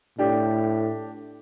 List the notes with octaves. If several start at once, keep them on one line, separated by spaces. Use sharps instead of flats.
A2 D4 G4